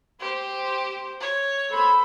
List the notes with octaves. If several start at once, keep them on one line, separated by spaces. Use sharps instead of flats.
G4 C5
C#5
A4 C5 B5